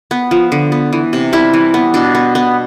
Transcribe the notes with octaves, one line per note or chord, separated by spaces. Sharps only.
B3
F3
D3
B3
E3
C3
G3 E4
E3
B3
B2 D4
B3
B3